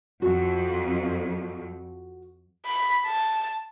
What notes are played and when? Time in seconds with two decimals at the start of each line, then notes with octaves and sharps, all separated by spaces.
0.22 F2 F#4 F#5
2.66 B5
3.07 A5